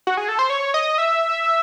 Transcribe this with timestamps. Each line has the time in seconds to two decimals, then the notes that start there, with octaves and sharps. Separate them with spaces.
0.07 F#4
0.17 G#4
0.29 A4
0.39 C5
0.50 C#5
0.74 D#5
0.98 E5